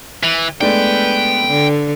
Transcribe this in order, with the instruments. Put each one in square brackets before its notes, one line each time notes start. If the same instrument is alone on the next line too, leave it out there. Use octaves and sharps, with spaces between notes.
[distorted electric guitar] E3
[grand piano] G#3 A3 D4 [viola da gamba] B3 B4 [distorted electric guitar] G5
[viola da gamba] D3